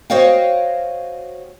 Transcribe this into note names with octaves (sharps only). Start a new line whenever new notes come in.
F#4 C5 C#5 D#5 F5 G5